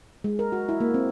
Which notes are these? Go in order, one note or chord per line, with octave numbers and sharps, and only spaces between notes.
G#3
A#4
F#4
E4
A#3
C4